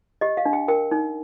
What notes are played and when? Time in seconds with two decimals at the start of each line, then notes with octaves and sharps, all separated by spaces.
0.21 G4 D#5
0.37 F5
0.45 D4
0.53 G5
0.68 A#4 G5
0.91 D#4